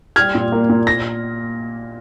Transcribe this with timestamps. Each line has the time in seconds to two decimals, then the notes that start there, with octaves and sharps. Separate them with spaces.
0.16 G3 F6 G#6
0.35 A#2
0.52 A#3
0.69 A#2
0.87 A#6